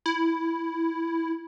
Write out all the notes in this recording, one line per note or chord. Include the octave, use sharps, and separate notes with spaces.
E4